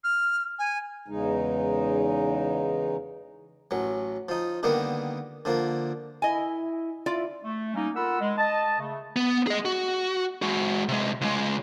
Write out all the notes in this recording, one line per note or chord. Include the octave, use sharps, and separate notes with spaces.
F6
G#5
E2 C#3 G#3 D#4
A1 F#3
F3 D#4
D3 D#3 G3 A#3 B3
D3 F3 A#3
E4 D#5 G#5
E4 F4 D5
A3
G3 A#3 C#4 D#4
F4 A4 A#4 F#5 B5 E6
G#3
D#5 A5
C#3 A3
B3
G#4 D#5
F#4
G#3 F#4
C3 G#3
C#2 G#3